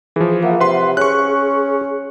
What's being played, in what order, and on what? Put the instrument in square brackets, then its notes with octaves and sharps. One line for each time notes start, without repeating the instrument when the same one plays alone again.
[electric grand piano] E3 F3 [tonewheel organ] G#4
[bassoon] A#3 [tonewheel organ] E5 F#5
[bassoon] C3 [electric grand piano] B4 C6
[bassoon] C#4 [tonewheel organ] G#4 [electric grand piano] C#6 F#6